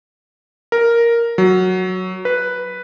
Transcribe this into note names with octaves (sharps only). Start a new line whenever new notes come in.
A#4
F#3
B4